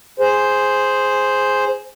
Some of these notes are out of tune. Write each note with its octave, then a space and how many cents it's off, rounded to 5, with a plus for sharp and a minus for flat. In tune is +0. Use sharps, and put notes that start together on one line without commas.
G#4 +0 C5 +0